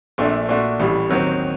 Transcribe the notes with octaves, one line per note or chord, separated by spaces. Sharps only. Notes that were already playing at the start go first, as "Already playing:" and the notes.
A#1 A#2 A3 D4
A#2 A3 D4 F#4
A1 A2 G3
D#2 D#3 F#3 C4